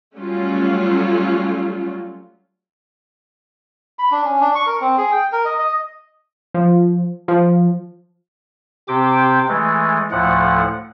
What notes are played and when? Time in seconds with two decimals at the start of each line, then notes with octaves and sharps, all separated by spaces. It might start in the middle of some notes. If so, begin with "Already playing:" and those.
0.16 F#3 G3 A3 C#4 F4 F#4
3.99 B5
4.11 D4
4.24 C#4
4.41 D4
4.55 C#6
4.67 A#4
4.81 C4
4.98 G#4
5.12 G5
5.32 A#4
5.45 D#5
5.59 D#5
6.54 F3
7.28 F3
8.88 C3 C4 G4 G5 D6
9.49 E3 G#3 A3
10.11 D2 A2 F3 F#5